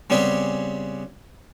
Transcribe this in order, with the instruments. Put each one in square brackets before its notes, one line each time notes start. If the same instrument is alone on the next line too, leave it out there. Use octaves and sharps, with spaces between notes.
[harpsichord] C#3 G3 B3 C4 G4 G#4